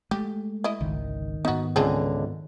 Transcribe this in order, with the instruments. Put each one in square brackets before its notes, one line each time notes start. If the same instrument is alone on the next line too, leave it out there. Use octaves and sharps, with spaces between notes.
[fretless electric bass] G#3 A3 [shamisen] G4
[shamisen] E4 D#5
[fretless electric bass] G#1 C#2 [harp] D#3
[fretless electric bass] G#2 B3 [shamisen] D#4 F#4
[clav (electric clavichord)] C#2 D3 [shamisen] C4 G#4 A4